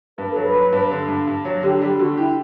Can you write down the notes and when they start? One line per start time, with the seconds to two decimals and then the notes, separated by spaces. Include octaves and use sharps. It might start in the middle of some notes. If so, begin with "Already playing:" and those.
0.18 G2 B4
0.31 A4
0.36 F#3
0.42 B4
0.54 F#3
0.72 G2
0.91 D3
1.08 G2
1.27 G2
1.45 F#3
1.63 D3 G4
1.81 G3 G4
1.99 D3 F#4
2.17 E4 G4